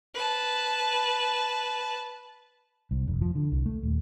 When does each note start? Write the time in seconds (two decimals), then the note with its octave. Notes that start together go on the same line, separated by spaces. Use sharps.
0.14 B4 A5
2.91 C2
3.07 F1
3.21 F3
3.35 D3
3.52 C2
3.66 A3
3.83 D#1